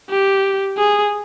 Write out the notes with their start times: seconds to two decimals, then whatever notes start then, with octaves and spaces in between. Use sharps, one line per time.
0.10 G4
0.78 G#4